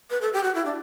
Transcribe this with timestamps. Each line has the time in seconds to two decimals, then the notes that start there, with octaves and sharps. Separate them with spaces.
0.10 B4
0.21 A4
0.33 G4
0.43 F#4
0.55 E4
0.65 D4